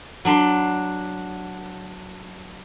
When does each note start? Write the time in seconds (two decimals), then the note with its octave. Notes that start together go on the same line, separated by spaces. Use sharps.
0.25 F#3 D4 B5 C6